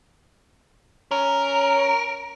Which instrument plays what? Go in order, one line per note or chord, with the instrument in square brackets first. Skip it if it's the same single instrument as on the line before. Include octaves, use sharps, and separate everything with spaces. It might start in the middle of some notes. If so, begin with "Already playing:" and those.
[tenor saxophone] C#4 [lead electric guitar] A#4